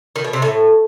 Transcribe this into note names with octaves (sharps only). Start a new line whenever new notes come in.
D#3
B2
C3
A2